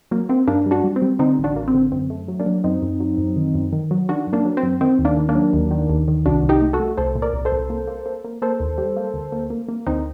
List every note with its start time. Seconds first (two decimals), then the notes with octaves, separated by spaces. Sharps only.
0.11 F#3 A#3
0.29 A#3 C4
0.47 G2 A#3 D4
0.66 G3
0.71 D4 F#4
0.84 G3
0.96 C4
1.02 G3
1.19 D3 C4 D#4
1.38 A1
1.44 D4 F#4
1.56 A1 A#3
1.68 C4
1.74 D3
1.92 F#2 C4
2.10 A3
2.28 F#3
2.40 A#3 D4
2.46 F#3
2.64 F#2 C4 D#4
2.82 F#2
3.00 F#3
3.18 F#2
3.36 D#3
3.55 F#2
3.73 D#3
3.91 F#3
4.09 D#3 D4 F#4
4.27 F#2
4.33 A#3 D4
4.45 F#3
4.57 C4
4.63 F#2
4.81 D#3 C4
4.99 D#2
5.05 A#3 D4
5.17 D#3
5.29 A#3 D4
5.35 F#3
5.53 D#2
5.71 D#3
5.90 D#2
6.08 D#3
6.25 C2 D4 F#4
6.43 C2
6.49 D#4 G4
6.62 A3
6.73 F#4 A4
6.80 A3
6.97 C2 A4 C5
7.15 A#2
7.22 A#4 D5
7.33 C2
7.45 A4 C5
7.52 C2
7.70 A#3
7.87 A#3
8.06 A#3
8.24 A#3
8.42 A#3 A4 C5
8.60 D#2
8.78 G3
8.97 A#3
9.14 D2
9.32 A#3
9.50 A#3
9.69 A#3
9.87 D2 C4 D#4